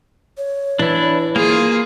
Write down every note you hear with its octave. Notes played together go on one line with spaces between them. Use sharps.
C#5
E3 D4 E4
A#3 F4 G#4